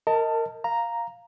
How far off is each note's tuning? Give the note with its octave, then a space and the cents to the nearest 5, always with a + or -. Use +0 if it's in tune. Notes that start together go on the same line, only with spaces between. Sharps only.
A#4 -20 D#5 +20 A5 +15
F5 +0 A#5 +0